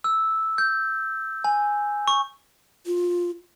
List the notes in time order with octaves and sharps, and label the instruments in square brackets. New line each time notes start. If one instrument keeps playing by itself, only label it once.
[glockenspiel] E6
G6
G#5
C#6
[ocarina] F4